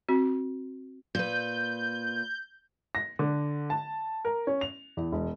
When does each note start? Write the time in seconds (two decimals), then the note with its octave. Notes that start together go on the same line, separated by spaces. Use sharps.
0.09 C4 F#4
1.15 A#2 B4 G6
2.95 A#6
3.19 D3
3.70 A5
4.25 A#4
4.47 C#4
4.61 F7
4.97 E2
5.12 E1